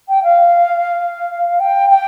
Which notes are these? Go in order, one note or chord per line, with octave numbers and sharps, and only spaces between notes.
G5
F5
G5
G5